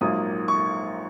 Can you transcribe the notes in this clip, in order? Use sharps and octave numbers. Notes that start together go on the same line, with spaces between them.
A#1 G#2 F#3 A#3 D#6
C#6